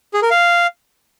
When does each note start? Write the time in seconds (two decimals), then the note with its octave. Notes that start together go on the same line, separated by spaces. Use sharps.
0.14 G#4
0.22 A#4
0.31 F5